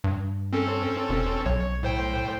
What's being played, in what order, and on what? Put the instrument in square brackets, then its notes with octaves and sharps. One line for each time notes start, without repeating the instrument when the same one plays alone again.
[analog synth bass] G2
[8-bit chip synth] C4 C#4 A4
[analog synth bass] E1
[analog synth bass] B1 [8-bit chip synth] C#5
[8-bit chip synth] A2 C5 G5